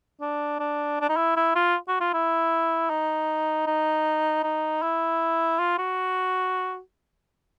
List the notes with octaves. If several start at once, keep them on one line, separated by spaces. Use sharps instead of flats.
D4
D4
D4
D#4
E4
E4
F4
F#4
F4
E4
D#4
D#4
D#4
E4
F4
F#4